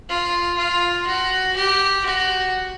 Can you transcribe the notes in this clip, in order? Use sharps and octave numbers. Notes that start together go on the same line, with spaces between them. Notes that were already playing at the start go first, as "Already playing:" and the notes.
F4
F4
F#4
G4
F#4